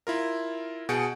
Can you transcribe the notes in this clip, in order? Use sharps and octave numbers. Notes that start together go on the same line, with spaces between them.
E4 F4 A#4
B2 G#4 F#5 G6 C#7 D7